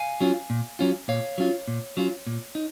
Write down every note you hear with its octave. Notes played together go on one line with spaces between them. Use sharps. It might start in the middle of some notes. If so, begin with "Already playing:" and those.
Already playing: F5 G#5
F#3 C#4 F4
A#2
F#3 C#4 F4
A#2 C#5 F5
F#3 C#4 F4
A#2
F#3 C#4 F4
A#2
D#4